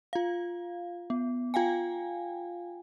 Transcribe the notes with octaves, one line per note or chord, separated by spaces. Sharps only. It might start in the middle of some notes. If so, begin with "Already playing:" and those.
F4 F5
B3
F4 F5 G5 G#5